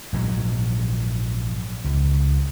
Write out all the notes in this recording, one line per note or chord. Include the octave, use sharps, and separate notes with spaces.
A#1 G#2 F3 F#3
C#2